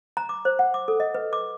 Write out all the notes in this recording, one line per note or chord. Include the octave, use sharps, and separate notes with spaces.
A#5
D6
C5
F#5
D6
A4
D#5
B4
D6